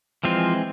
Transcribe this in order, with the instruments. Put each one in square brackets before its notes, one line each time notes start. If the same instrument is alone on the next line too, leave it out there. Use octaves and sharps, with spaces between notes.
[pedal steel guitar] E3 F3 G#3 C4 F4